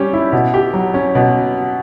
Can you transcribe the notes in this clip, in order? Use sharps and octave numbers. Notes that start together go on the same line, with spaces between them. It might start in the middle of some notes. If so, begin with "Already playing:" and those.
Already playing: G3 C#4 G4
E4
B2
G4
F#3
C#4
B2